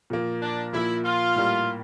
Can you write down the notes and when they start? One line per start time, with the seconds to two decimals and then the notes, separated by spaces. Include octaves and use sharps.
0.10 A#2 F3 A#3
0.42 D4
0.73 A#2 F3 A#3 E4
1.04 F4
1.36 A2 G3 A#3